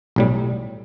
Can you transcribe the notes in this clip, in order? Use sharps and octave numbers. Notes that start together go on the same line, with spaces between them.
B1 A2 G3